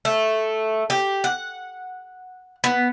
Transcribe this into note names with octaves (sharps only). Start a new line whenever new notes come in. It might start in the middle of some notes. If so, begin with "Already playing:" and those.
A3
G4
F#5
B3